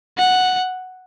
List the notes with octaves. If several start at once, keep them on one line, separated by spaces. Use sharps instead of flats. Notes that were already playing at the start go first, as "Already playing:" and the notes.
F#5